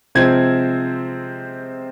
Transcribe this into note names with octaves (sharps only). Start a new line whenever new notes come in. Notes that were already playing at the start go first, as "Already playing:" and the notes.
C3 F3 G#3 C4 G#6